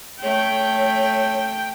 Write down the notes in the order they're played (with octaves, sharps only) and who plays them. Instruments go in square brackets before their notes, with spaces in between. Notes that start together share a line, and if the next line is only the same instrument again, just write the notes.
[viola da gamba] A3 [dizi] C#5 [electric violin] G5